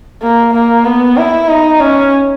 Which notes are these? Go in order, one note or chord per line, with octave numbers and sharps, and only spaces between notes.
A#3
A#3
B3
E4
D#4
C#4